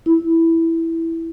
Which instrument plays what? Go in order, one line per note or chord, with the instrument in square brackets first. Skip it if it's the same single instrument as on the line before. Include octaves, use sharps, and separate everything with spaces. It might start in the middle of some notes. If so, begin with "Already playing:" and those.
[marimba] E4